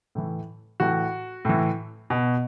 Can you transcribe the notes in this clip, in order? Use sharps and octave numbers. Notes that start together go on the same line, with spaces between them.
A2 E3
A2 E3 F#4
A2 E3
B2